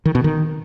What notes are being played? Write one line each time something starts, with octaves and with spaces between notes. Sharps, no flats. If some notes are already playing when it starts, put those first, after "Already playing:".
D#3
B2
D#3